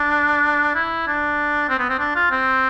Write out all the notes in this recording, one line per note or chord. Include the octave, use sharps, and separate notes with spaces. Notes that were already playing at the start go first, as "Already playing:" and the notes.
Already playing: D4
E4
D4
C4
B3
C4
D4
F4
C4